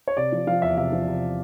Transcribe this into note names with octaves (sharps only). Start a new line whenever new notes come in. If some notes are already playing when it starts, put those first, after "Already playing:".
C#5
C3 D5
F3
F3 F5
E2 E5
C3 E5
F3
C3